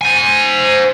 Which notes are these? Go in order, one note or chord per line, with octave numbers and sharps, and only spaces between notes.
C5 G#5